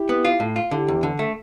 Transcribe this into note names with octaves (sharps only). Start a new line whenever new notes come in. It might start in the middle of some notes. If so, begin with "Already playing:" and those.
Already playing: E4 G4
B3
F4
A2
F4
D3 E4 G4
E2
D3
A3